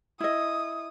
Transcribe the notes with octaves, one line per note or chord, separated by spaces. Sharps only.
E4 D#5 D#6